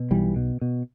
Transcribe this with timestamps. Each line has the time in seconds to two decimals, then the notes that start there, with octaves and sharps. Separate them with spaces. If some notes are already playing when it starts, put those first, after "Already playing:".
Already playing: B2
0.11 B1 E3 G3
0.36 B2
0.61 B2